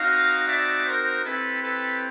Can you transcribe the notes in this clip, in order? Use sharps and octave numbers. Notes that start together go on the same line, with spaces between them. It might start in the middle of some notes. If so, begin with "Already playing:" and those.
Already playing: C4 D#4 F#4 D#5 F5
D5 E5
A#4 C5
C4 E4 G4 A4 B4
A4 B4